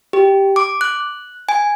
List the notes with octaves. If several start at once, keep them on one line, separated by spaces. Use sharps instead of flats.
G4
D6
F#6
G#5